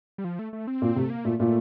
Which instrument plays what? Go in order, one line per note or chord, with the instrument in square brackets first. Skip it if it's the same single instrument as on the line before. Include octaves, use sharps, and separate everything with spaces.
[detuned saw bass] G3
F3
A3
A3
C4
[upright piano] A#2
[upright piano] C3 [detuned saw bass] A3
[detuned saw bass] A#3
[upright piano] A#2 [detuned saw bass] A3
[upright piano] A#2 [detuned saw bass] A3